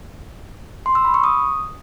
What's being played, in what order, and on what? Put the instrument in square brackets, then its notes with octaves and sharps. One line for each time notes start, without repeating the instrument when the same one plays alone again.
[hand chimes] C6
E6
B5
C#6
D#6